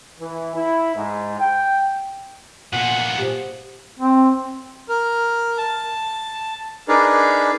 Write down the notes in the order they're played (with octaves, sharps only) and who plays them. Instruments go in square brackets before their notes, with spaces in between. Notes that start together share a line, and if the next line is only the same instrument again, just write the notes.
[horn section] E3
E4
G#2
G5
[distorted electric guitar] A#2 B3 [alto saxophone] F#5
[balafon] G4 C5
[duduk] C4
[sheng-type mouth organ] A#4
A5
D4 D#4 G#4 A#4 B4 D5